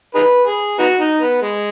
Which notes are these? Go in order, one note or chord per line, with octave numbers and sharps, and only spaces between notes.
D#4 G#4 B4
G#4
B3 D#4 F#4
D#4
B3
G#3